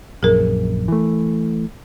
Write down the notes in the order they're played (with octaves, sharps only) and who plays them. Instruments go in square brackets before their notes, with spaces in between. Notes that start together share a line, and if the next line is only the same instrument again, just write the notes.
[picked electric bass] A#1 F#2 [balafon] G#4 A#4
[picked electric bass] E3 A3